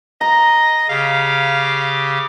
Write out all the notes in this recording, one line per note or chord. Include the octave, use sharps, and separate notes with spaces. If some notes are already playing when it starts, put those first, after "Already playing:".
D#5 A#5
C#3 G4 F5 D6